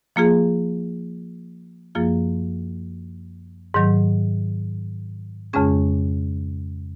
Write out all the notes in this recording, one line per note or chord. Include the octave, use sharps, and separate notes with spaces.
F3 A#3 F4 G#4
F#2 F3 A#3 F4 G#4
G#2 D#3 F#3
F2 C#3 G#3 C#4 G#4